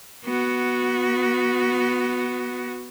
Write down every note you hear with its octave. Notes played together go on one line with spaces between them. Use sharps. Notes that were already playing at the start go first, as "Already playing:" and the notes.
B3 F#4